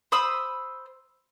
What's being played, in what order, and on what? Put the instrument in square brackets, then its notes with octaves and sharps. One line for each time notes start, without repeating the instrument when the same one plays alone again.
[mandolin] C5 B5 D#6 E6